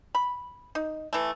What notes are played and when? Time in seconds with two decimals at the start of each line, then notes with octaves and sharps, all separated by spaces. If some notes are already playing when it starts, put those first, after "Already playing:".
0.15 B5
0.75 D#4
1.13 E3 A3